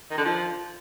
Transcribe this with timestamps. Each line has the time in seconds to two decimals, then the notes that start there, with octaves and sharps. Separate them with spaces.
0.11 D#3
0.18 D3
0.25 F3